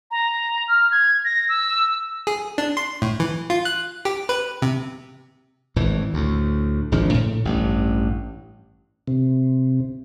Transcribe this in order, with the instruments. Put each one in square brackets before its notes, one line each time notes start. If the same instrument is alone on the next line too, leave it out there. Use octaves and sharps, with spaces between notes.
[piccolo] A#5
F6
G#6
A#6
E6
[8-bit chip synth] G#4
D4
C6
A2
E3
F4
F#6
G4
B4
C3
[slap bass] G#1 A2 E3
D2 A2
G#1 C#3 F3 D4
A2
A1 G2
[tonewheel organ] C3